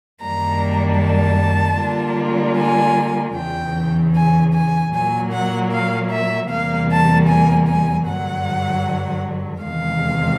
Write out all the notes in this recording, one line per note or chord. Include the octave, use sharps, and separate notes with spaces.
F#2 D#3 G3 A#3 D4 A#5
A5
D3 G3 A#3 D4 F4
G#5
E2 C#3 E3 G5
G#5
G#5
A#2 F#3 A#3 G#5
F#5
F5
E5
E2 C3 E3 G3 A#3 F5
A5
G#5
G#5
G2 D3 F#3 F#5
E2 C3 D#3 G#3 F5